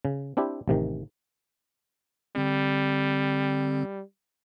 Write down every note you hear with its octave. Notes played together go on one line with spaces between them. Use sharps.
C#3
C4 D4 E4 G4
A1 C3 D#3
D3 G3 C4